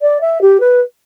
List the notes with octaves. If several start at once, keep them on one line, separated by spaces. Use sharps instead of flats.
D5
E5
G4
B4